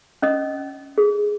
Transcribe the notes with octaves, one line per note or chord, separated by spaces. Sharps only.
C#4 D#5 D#6
G#4